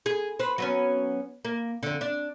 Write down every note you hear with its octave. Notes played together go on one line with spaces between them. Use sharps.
G#4
B4 C5
F#3 B3 C#4
A#3
F2 D3
D4